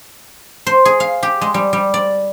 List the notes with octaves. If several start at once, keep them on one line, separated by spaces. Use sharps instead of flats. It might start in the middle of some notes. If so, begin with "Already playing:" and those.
C5
G#4
F5
G4
G#3
G3
G3
D5